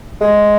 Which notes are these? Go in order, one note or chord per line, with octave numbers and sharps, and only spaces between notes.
G#3